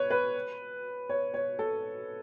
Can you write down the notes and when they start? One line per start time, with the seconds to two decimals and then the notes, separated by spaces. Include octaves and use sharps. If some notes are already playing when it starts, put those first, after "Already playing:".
Already playing: B4 C#5
0.10 B4
1.09 C#5
1.34 C#5
1.59 A4